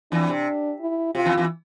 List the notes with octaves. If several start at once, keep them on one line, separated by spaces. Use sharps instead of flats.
E2 E3 D4
C3
E4
C3 F4
E2 E3
E2 E3